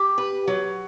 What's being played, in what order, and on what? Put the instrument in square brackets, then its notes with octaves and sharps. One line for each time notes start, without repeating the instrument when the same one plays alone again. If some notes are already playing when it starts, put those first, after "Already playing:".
Already playing: [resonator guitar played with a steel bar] G4
B4
F#3